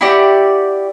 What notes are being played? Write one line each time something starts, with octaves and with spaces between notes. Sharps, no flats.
E4 F#4 G4 D5